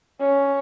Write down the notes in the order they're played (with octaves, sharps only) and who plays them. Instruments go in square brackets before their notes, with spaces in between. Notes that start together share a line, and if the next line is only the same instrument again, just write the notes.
[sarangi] C#4